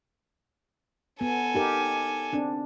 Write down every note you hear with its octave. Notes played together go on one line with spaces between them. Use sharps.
B3 A4 G#5
D#4 G4 A#4
C4 D4